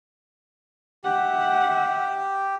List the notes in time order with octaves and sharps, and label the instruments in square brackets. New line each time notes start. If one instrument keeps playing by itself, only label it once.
[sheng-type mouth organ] G4 [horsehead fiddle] E5 F#5